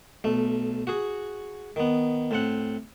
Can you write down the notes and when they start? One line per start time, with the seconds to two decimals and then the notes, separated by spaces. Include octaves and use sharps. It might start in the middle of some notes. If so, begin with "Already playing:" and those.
0.24 B1 A3
0.87 F#4 G#4
1.76 D#3 B3
2.31 A2 C4 F#5